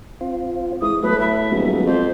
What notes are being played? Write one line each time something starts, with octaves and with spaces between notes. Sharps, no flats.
C4 F4
E3 G#3 D#6
A2 F#3 A3 B3 B4
B4 E5
D#1 F#3 G#3 B3
F2 C5